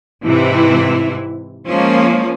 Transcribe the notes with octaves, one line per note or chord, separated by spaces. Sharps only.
G#2 C3 E3 E4
F3 G#3 A#3 C#4